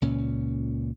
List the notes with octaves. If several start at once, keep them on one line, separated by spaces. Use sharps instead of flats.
C#2 A#2 C#4